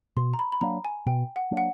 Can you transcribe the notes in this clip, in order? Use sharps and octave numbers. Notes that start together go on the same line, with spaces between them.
B2 C6
A#5
B5
B5
F#3 A#3 D4 A#5
G#5
B2 G5
F#5
F#3 A#3 D4
F#5